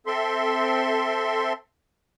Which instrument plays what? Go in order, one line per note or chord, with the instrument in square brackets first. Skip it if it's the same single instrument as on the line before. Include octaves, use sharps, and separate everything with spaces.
[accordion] C4 A4 E5 C6